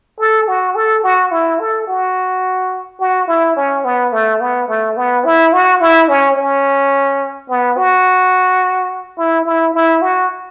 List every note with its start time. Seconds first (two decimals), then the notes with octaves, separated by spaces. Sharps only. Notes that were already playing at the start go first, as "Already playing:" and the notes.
0.19 A4
0.48 F#4
0.75 A4
1.04 F#4
1.31 E4
1.60 A4
1.87 F#4
3.00 F#4
3.28 E4
3.56 C#4
3.84 B3
4.13 A3
4.40 B3
4.68 A3
4.96 B3
5.25 E4
5.53 F#4
5.81 E4
6.08 C#4
6.36 C#4
7.49 B3
7.77 F#4
9.17 E4
9.45 E4
9.74 E4
10.02 F#4